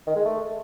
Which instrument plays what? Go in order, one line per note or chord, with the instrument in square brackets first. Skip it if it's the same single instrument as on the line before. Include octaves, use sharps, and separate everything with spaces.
[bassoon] D#3
G#3
A3